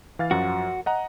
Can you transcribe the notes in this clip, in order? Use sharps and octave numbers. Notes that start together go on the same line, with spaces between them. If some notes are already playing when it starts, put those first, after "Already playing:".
E3 F5 A6
F#2 F3 F#4
D#5 F#5 A#5